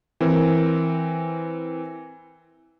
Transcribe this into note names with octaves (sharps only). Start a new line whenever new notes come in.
E3 C4 A#4